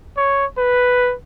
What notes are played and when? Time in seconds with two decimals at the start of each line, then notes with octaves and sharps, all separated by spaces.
0.17 C#5
0.58 B4